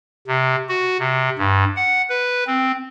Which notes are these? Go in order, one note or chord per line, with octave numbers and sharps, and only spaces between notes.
C3
F#4
C3
G2
F#5
B4
C4